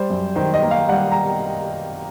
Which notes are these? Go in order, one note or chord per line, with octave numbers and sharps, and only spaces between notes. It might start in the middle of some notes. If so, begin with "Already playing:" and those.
Already playing: G3 C5
F#2
D#3 C5
D#5
A#3
F5
G3 F#5
A#5